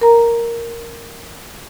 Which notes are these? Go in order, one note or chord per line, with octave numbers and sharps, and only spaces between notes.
A#4 A#5